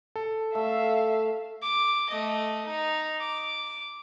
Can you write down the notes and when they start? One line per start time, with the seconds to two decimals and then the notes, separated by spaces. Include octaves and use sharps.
0.16 A4
0.55 A3 E5 F5
1.62 D6
2.10 A3 D#5
2.66 D#4
3.20 D6